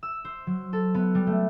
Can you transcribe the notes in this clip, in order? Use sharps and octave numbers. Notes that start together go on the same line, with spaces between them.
E6
C5
F#3
A4
B3
G3
A3